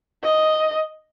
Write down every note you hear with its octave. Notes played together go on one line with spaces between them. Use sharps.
D#5